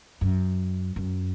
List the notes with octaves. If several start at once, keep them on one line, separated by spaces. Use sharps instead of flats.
F#2
F#2